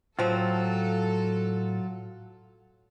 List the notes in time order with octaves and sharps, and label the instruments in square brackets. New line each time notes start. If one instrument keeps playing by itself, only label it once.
[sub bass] A2 [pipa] F3 C4 [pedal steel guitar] F#3 F4 [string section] A4